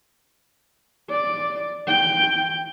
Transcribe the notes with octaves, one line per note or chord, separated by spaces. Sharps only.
D5
G5